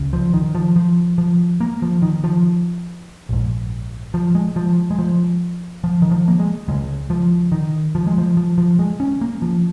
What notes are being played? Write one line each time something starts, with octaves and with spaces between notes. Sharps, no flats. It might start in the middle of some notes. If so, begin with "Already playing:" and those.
Already playing: C#2 C#3
F3
D#3
F3
F3
F3
A#3
F3
D#3
F3
A#1 G#2
F3
G#3
F3
G#3
F3
F3
D#3
F3
A#3
G#3
C#2 C#3 G#3
F3
D#3
F3
G#3
F3
F3
F3
G#3
C#4
A#3
F3